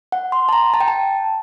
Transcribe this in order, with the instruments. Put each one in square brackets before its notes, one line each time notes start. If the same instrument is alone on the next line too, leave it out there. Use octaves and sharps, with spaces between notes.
[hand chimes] F#5
C6
A5
A#5
A5
G5
A5